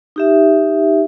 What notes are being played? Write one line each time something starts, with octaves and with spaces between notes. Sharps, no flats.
D#4 G4 E5